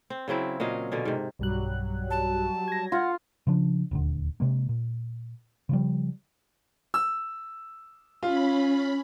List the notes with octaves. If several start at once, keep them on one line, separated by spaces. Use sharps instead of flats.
C4
C#3 F#3 C4 E4
A#2 F#3 D#5 F5
B2 D3 C#4
G#2 C3
B1 G2 F#3 G3 F#6
A5
G#6 A#6
F4 F#5
C#3 F3 D4
D#1 D2 D3
C3 G#3 A#3
A#2
C#3 F3 G3
E6
C#4 F4 B5